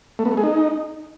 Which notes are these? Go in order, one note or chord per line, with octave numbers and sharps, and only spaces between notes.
A3
B3
A3
G#4
D#4